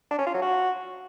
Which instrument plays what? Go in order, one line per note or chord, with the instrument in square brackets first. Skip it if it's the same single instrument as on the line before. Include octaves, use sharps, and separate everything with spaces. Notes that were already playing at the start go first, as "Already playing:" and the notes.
[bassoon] D4
C#4
F4
F#3
F#4